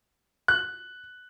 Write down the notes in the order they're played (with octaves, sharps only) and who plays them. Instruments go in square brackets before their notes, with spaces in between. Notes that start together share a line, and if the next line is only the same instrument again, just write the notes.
[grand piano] F#6